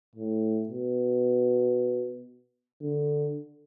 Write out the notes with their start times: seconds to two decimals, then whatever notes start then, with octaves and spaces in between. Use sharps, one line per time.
0.16 A2
0.69 B2
2.83 D3